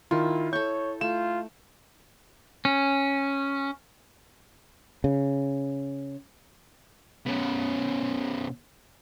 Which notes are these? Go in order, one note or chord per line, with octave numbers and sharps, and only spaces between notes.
D#3 E4 F4
A4 C#5 C#6 G6
A3 F4 E7
C#4
C#3
B2 C#4